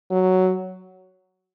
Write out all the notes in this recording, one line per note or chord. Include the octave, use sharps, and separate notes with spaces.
F#3